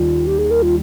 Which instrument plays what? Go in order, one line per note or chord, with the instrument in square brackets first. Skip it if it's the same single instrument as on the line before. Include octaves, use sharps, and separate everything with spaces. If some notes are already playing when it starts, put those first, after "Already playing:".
Already playing: [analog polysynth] D#2 D#3 G3 [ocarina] F4
[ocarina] G4
G#4
A#4
F4